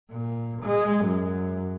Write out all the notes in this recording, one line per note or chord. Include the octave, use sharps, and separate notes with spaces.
A#2
G#3
F#2